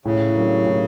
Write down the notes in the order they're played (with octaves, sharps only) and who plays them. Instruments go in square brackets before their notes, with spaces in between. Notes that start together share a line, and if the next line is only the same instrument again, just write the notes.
[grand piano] A2 [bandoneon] C#3
[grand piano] F#3 A#3 D4 G4
A2